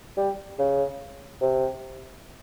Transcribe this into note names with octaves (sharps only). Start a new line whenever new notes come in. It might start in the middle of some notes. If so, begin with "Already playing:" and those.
G3
C#3
C3